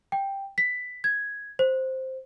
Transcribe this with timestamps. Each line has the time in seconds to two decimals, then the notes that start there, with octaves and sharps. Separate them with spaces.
0.12 G5
0.58 B6
1.04 G#6
1.59 C5